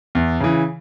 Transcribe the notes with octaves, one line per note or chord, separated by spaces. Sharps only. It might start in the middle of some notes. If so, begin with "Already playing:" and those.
E2
C#3 E3